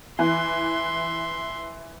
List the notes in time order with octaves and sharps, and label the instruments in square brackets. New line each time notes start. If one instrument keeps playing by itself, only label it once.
[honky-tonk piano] E3 [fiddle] E5 C6